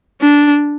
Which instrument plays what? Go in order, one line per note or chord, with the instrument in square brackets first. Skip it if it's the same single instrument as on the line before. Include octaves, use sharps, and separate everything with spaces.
[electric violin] D4